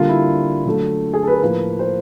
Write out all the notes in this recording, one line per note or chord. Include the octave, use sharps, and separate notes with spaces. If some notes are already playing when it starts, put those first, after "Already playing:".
Already playing: D3 G3 A#3 F4
E4
D3 F#3 A3
G#4
A4
B4
A#4
A2 F3 A#3 B4
C5